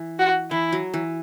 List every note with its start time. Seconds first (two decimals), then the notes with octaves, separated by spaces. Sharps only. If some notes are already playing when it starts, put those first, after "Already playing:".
Already playing: E3
0.19 F#4
0.51 E3 E4
0.72 F#3
0.94 E3